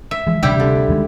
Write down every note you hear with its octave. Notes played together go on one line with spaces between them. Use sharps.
E5
E3 F3 G#3
D2 C3 G3 D4 E4 G4
D3
D#2 D#3 G#3